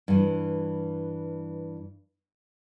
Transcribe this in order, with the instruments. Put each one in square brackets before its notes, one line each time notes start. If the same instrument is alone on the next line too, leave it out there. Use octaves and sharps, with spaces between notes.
[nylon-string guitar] G2 E3